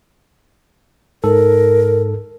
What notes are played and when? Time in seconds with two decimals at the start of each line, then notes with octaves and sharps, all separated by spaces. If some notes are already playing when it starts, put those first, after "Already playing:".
1.24 G#2 A4 A#4